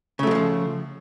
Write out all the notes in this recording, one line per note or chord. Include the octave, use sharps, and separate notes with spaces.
C#3 F3 F#3 G#3 A3